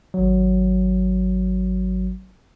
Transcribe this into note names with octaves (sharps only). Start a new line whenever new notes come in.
G#1 F#3